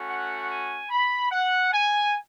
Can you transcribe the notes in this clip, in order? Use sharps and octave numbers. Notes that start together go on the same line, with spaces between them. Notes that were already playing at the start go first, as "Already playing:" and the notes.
Already playing: A3 C#4 F#4
F#5
G#5
B5
F#5
G#5